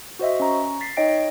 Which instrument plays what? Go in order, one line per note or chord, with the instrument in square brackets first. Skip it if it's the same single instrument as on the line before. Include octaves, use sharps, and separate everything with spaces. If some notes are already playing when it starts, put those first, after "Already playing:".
[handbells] F#4 C5 D#5 E5
C#4 A#5 C#6
A6 B6 C7
D#4 C#5 D#5 G5 A#6 D7